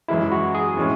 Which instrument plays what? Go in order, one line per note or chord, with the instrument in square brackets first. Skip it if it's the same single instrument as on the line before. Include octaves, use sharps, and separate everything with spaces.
[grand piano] F#2 E3 G#3 [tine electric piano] E4
[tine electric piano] F#4
G#4
[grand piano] A2 E3 G#3 C#4